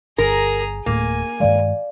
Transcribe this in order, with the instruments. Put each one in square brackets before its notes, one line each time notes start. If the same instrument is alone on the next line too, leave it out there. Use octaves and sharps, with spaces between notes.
[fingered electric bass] G1 [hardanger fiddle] G#4 A#5 [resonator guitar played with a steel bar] A#4
[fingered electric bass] D1 A2 A3 [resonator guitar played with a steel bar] A#3 [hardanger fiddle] G#5
[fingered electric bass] G2 D#3 G#3 [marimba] D5 F5